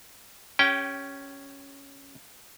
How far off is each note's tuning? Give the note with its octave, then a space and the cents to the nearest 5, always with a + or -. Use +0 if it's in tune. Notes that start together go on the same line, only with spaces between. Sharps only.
C#4 +0 G4 +0 G5 -25